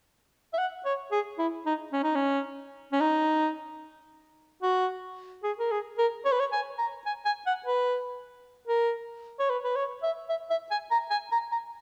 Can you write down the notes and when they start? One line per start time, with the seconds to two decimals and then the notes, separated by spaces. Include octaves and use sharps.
0.54 E5
0.58 F#5
0.85 C#5
1.12 G#4
1.39 E4
1.66 D#4
1.93 C#4
2.04 D#4
2.16 C#4
2.92 C#4
3.01 D#4
4.63 F#4
5.44 G#4
5.59 A#4
5.71 G#4
5.98 A#4
6.25 C#5
6.32 B4
6.40 C#5
6.52 G#5
6.78 A#5
7.06 G#5
7.26 G#5
7.47 F#5
7.66 B4
8.68 A#4
9.40 C#5
9.50 B4
9.64 B4
9.76 C#5
10.03 E5
10.30 E5
10.50 E5
10.71 G#5
10.91 A#5
11.11 G#5
11.32 A#5
11.52 A#5